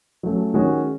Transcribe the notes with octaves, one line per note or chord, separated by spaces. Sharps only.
F#3 A3 C#4
D#3 G#3 C#4 F#4